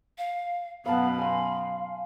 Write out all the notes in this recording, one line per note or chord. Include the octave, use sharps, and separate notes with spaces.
F5
F#2 B2 B3 F5 A5 B5
F5 G#5 C6